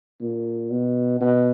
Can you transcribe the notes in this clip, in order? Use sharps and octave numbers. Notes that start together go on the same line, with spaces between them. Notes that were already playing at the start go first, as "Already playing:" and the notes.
A#2
B2
B2